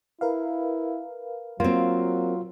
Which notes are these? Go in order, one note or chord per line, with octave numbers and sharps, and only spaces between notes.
E4 A#4 B4 F5
F#3 A#3 C4 F4